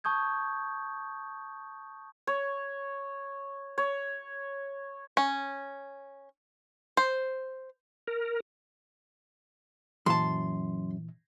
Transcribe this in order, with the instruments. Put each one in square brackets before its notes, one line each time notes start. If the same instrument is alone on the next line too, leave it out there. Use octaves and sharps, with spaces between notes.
[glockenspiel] A5 C#6 D#6 G6 G#6
[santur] C#5
C#5
[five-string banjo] C#4
C5
[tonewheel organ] A#4
[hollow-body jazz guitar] F#2 A5 [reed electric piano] A#2 E3 [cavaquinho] C6